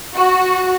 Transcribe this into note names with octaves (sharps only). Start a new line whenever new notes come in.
F#4